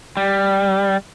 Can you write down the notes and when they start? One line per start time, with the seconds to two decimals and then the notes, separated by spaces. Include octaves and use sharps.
0.17 G3